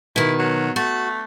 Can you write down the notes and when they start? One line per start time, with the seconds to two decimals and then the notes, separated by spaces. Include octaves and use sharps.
0.16 B2 D#3 E4
0.39 F#3
0.76 A3 F#4